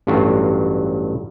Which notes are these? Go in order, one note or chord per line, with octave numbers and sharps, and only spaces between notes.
A1 G2 F#3 F4 F#4